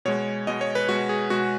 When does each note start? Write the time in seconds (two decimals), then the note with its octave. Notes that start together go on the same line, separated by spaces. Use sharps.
0.05 B2 G#3 C#5
0.47 B2 G#3 D#5
0.61 C#5
0.75 B4
0.89 B2 G#3 F#4
1.09 G#4
1.30 B2 G#3 F#4